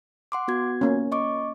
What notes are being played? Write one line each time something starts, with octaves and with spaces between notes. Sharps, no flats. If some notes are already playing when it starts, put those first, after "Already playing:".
F#5 C6 D6
B3 F#4 G#6
A#3 C#4
D#5 C#6 D6